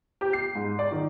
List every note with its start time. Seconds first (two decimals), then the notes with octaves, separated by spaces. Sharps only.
0.21 G4
0.33 C7
0.55 G#2
0.79 D5
0.92 D#3